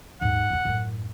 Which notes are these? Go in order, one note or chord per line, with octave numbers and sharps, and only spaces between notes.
D#2 G#2 F#5
E2 A#3
F#2 A2